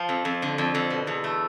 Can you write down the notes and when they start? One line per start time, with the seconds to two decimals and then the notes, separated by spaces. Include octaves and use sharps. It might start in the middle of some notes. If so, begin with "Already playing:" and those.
Already playing: F3
0.09 F2
0.25 F2
0.42 D3
0.58 F2
0.75 F2
0.90 B2
1.07 E2
1.24 A3